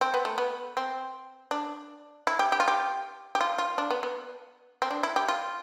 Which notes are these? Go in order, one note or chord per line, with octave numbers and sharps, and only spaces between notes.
C4
B3
A3
B3
C4
D4
E4
G4
G4
F4
G4
G4
F4
F4
D4
B3
B3
C4
D4
E4
G4
F4